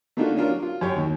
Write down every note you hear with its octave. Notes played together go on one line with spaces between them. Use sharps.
A3 A#3 D4 D#4 F4 F#4
C#4 D4 F4 A#4
F#3
F4
F#2 G4 C#5
D#2